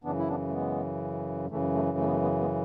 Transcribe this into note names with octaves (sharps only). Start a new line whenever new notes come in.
F#2 C#3 E3 B3 D4
E4
B3 D4
A3
G#3 B3
F#2 C#3 E3 A3
A3
A3
B3
A3
G#3 B3
G#3 B3